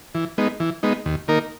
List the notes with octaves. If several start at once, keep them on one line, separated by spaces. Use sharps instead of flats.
E3
G#3 B3 D#4
E3
G#3 B3 D#4
D#2
D#3 A#3 D#4 A#4